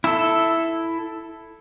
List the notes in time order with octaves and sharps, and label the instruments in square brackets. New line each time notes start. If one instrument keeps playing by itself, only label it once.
[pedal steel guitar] E4 A4 [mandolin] E6